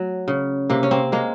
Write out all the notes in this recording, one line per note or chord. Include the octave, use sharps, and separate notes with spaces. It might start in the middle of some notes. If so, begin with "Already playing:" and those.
Already playing: F#3 A3
C#3
C3 A#3
C#4
A#3 C4
G#3 A#3